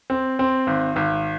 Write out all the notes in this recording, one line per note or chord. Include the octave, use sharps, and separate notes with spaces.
C4
C4
G#1
G#1